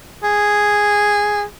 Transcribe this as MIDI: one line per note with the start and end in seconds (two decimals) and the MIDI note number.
0.23 1.43 68